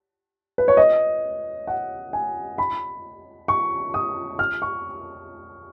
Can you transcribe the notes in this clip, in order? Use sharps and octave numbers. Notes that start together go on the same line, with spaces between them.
B4
C#5
D#5
F#5
G#5
B5
C#6
D#6
F6
C#6